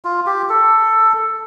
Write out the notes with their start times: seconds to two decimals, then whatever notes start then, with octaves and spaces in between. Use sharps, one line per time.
0.05 F4
0.26 G4
0.49 A4